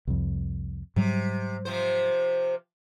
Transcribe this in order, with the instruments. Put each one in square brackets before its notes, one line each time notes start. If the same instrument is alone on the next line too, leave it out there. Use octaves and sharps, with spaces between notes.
[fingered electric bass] C2 F2
[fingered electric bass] G#2 F#3 G3 [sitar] C3
[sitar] C3 F3 C5